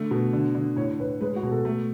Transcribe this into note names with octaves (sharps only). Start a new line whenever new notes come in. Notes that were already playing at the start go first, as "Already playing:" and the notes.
Already playing: D3 A3
B2
D3
D3
A2 C#5
A2 B4
G#3 B4
F#4
B2
A4
A3